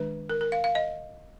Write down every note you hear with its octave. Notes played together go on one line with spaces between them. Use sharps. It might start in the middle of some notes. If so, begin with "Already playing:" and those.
Already playing: D#3 G#3 D4 B4
A#4
A#4
F5
F5
D#5